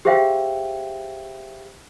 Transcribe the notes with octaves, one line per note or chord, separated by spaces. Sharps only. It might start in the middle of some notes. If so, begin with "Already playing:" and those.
G4 G#4 C5 E5 F5 G5